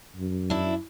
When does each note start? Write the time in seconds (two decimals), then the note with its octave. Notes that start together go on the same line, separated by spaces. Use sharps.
0.16 F#2
0.50 D4 E4